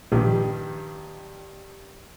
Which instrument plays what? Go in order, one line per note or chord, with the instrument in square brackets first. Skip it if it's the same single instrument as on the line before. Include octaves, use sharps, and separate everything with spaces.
[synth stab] A#1 [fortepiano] G2 D#3 G3